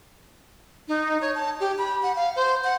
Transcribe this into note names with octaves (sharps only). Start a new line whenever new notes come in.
D#4
C#5
A5
G4
B5
F#5
F5
C5
F#5